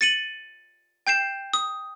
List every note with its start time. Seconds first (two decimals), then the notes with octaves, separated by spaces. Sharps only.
0.01 A6 C#7 D#7 F#7
1.07 G5 G6 C7 E7
1.53 D#6